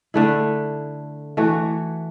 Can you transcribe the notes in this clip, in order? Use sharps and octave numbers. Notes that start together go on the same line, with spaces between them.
D3 A3 E4
E3 A3 F#4